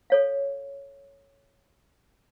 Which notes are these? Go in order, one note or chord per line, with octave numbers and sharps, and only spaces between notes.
A4 C#5 F5